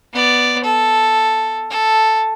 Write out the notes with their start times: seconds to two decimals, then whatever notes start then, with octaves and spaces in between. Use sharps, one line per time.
0.13 B3 D5
0.64 A4
1.71 A4